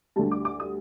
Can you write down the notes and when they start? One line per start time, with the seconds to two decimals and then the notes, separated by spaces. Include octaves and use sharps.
0.16 D2 D3 G3 A5
0.31 D6
0.45 D6
0.60 D#6